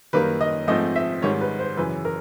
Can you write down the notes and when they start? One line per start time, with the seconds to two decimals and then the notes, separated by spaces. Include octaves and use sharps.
0.13 F#2 D#3 G3 A#3 B4
0.41 D#5
0.68 G#2 F3 A3 C4 D#5
0.96 E5
1.22 G#2 D#3 G3 C#5
1.41 B4
1.59 C5
1.77 F#2 C#3 E3 B4
2.05 A#4